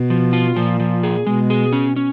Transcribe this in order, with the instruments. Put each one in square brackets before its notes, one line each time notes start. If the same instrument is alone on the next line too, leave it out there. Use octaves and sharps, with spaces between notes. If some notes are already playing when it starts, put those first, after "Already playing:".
Already playing: [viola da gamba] B2
[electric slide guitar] F3
F4
[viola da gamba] A#2 [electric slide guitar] F3
[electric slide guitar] F3
G#4
[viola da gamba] B2 [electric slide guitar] G#3
[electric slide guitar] G#4
C#4
C#4